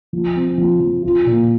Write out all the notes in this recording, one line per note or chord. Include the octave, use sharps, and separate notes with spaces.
F3
C4
F3
F3
F4
A#2